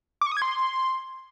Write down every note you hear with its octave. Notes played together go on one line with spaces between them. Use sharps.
D6
C#6
D#6
G#6
C6